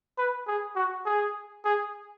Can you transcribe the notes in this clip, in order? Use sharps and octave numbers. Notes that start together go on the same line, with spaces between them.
B4
G#4
F#4
G#4
G#4